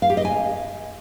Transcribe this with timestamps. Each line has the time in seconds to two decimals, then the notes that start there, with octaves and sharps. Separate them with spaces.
0.02 F5
0.10 G4
0.17 D#5
0.25 G#5